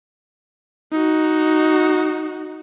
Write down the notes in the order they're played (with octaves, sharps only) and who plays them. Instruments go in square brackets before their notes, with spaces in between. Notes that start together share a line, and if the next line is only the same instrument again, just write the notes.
[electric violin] D#4 F#4